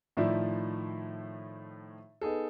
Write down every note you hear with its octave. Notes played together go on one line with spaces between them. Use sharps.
A2 D#3 F3 E4 D5 E5
B3 D#4 G#4 A4